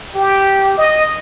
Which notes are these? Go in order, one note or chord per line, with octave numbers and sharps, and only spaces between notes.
G4
D#5